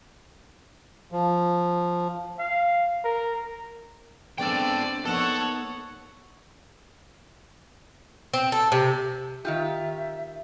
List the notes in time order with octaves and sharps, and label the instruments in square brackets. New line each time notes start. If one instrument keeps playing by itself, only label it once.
[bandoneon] F3
[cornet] F5
A#4
[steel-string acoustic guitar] G#3 B3 D4 [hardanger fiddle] C4 D5 [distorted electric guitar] A4 G5
[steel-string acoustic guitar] A#3 B3 D#4 [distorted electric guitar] A4 [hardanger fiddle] C#5 F#5
[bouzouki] C4
A4
C3
[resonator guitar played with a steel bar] D#3 F4 G4 [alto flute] E5